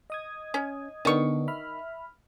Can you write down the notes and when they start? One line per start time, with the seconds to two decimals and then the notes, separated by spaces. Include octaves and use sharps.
0.10 D#5 D#6 G#6
0.54 C#4
1.05 D3 D#3 B3 D4 C#6
1.48 E5 B5 F6